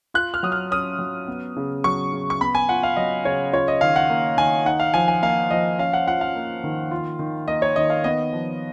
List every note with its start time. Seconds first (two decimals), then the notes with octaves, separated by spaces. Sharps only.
0.14 F4 F#6
0.34 F6
0.43 F#3 D#6
0.52 F6
0.71 C#4 D#6
0.99 F#3
1.28 B3
1.56 C#3
1.84 F#3 C#6
2.12 C#3
2.30 C#6
2.41 B3 B5
2.55 G#5
2.69 F4 F#5
2.83 F5
2.96 F#3 D#5
3.25 C#3 C#5
3.53 F4 C#5
3.68 D#5
3.81 D#3 F5
3.96 F#5
4.10 A#3
4.37 D#3 G#5
4.66 D#4 F#5
4.80 F5
4.94 F3 G#5
5.08 G#5
5.22 A#3 F5
5.50 F3 D#5
5.79 C#4 F5
5.93 F#5
6.07 F4 F#5
6.21 F5
6.35 A#3
6.64 D#3
6.91 F4
7.19 D#3
7.48 A#3 D#5
7.62 C#5
7.76 D#3 D#5
7.90 F5
8.04 B3 D#5
8.33 F3